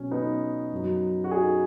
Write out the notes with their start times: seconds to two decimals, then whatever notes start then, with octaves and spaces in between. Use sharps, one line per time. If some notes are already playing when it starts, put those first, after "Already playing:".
Already playing: B2 F#3 C#4
0.11 B3 D#4
0.72 F#2 F#3
1.24 F#4
1.31 D#4 G#4